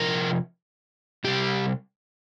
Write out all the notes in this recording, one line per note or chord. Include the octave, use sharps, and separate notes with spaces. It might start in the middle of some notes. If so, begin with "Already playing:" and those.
Already playing: C3 F3 A#4
C3 G3 G4